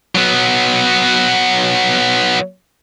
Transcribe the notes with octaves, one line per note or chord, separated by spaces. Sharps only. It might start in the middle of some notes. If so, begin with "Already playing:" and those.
F#3 B3